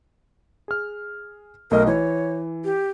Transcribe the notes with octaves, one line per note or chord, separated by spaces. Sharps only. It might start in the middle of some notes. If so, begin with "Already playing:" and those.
G#4 F6
B1 A3 A#4 D#5
E3 C#5
G4